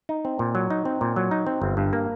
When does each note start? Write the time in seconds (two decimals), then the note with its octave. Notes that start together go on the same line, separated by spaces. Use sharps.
0.09 D#4
0.25 C4
0.39 A#2
0.55 F#3
0.70 D#4
0.85 C4
1.01 A#2
1.16 F#3
1.31 D#4
1.47 C4
1.62 G1
1.77 G2
1.93 A#3